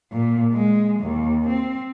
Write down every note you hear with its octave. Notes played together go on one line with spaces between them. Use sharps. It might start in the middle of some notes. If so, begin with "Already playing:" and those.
A#2
G#3
D#2
C4